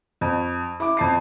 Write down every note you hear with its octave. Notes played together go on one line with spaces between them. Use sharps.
F2
E4 D6
F2 A5 C7